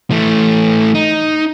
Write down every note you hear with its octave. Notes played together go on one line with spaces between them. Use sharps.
E3 A3
D#4